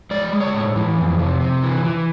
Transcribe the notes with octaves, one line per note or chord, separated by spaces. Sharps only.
G#3 D5
G#3
C#5
A2
E3
F2
C3
C3
E3
E3